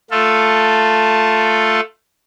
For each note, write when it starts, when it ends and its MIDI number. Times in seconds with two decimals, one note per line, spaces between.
0.11 1.80 57
0.11 1.80 65
0.11 1.80 69